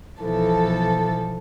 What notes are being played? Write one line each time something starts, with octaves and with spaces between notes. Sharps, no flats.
B1 E3 F3 A4